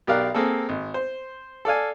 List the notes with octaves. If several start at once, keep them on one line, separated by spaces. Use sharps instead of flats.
B1 G4 A#4 D5 F5 F#6
A#3 C4 G#4 A4
G#1
C5
A4 D5 F5 G#5